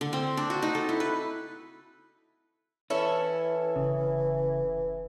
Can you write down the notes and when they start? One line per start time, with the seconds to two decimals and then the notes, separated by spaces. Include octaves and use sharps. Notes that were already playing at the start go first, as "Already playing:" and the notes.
0.01 D3
0.13 C4
0.37 D4
0.50 F#4
0.62 D#4
0.75 A4
0.89 E4
1.00 B4
2.90 E3 C#4 E4 A4 E5
3.76 F1 C#3